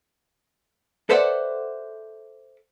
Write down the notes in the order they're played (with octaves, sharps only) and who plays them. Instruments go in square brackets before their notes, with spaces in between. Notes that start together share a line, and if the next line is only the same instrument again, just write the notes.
[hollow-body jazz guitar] A4 B4 C5 D5 E5 F#5